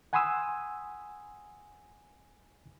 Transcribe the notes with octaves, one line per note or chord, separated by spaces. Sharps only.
F#5 G#5 B5 C6 D#6 E6